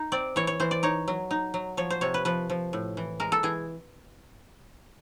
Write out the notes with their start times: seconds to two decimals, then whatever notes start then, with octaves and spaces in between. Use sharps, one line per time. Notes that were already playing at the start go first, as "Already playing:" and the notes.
Already playing: D#4
0.12 C4 D5
0.36 E3 C#5
0.47 C#5
0.60 E3 C5
0.71 D5
0.83 D#4 C#5
1.08 F#3
1.31 D#4
1.54 F#3
1.77 F3 C#5
1.90 C5
2.01 C3 C#5
2.14 B4
2.25 F3 B4
2.50 F3
2.73 A2
2.97 E3
3.20 G#3 A#4
3.32 A4
3.43 E3 G#4